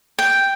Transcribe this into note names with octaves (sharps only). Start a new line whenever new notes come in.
G5